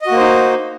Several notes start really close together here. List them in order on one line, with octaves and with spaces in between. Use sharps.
D#5 F#4 A#3 C5 D#4